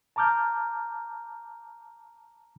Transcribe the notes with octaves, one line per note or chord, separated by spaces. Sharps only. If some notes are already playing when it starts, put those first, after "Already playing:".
A5 A#5 D6 F6 G6